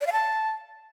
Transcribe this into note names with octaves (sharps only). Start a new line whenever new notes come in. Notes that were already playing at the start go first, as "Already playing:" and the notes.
D5
F5
A5